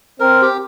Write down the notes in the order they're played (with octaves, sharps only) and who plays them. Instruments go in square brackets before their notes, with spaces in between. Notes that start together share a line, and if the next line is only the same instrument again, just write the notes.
[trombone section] C4 [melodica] A#4
[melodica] G4